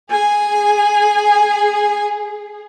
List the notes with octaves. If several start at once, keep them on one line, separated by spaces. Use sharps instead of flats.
G#4 G#5